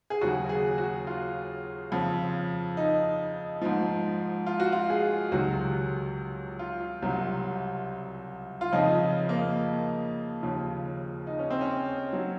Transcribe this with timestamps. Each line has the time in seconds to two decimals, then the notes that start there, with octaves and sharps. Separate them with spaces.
0.10 G#4
0.21 D#2 C#3 F#3 F#4
0.49 G#4
0.78 F#4
1.07 F4
1.91 F2 C#3 F3
2.77 D#4
3.61 G#2 F3
4.46 F4
4.60 F#4
4.72 F4
4.90 G#4
5.31 C#2 C3 D#3 F#3 F#4
6.59 F4
7.02 C2 C3 F#3
8.61 F4
8.72 F2 C#3 F3 D#4
9.29 A#3
10.43 D#2 C#3 F3
11.27 D#4
11.39 C#4
11.50 C4
11.61 C#4
12.13 F#3